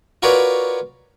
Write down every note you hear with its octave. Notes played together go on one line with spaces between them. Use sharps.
F4 F#4 A#4 B4 C#5 D5